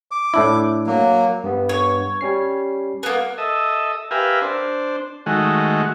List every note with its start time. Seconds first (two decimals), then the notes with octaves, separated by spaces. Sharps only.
0.11 D6
0.34 A2 D4 E4
0.87 F#3 A#3
1.44 G2 B3
1.69 C#5
2.21 G3 C#4 C7
3.03 A#3 B3
3.38 A4 D#5 E5
4.11 G4 A#4 B4 E5 F5 G#5
4.42 D4 C5
5.26 D#3 G#3 A3 F#4